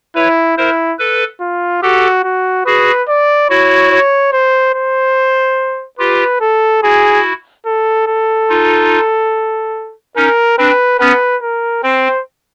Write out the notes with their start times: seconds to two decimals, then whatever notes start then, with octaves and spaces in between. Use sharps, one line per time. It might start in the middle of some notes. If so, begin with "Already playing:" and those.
0.15 E4 B4 C#5
0.57 E4 A#4 C5
0.99 A4 B4
1.41 F4
1.82 F#4 G4 A4
2.24 F#4
2.65 F#4 G#4 B4
3.08 D5
3.49 E4 F#4 C#5
3.91 C#5
4.32 C5
4.74 C5
5.99 F4 G4 B4
6.41 A4
6.83 E4 F#4 G#4
7.66 A4
8.07 A4
8.49 D#4 F4
10.16 C#4 D#4 A#4
10.58 C4 D4 B4
10.99 B3 C#4 B4
11.42 A#4
11.83 C4 C5